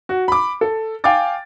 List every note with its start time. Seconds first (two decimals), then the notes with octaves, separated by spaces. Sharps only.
0.09 F#4
0.28 B5 D6
0.61 A4
1.04 F5 G5 G#5 D6 A6